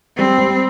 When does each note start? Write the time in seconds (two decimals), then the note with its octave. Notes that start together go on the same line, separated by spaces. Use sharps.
0.18 G3 C4
0.38 G3